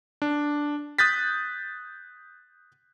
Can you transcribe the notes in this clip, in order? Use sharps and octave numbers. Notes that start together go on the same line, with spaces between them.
D4
D#6 F#6 G6 A6 B6